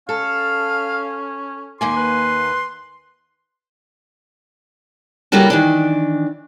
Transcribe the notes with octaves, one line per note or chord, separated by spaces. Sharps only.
C#4 A4 F5
D#2 A#3 G#5 C6 D6
B4
C#3 G3 A#3 E4 F#4 A4
D#3 E3 D4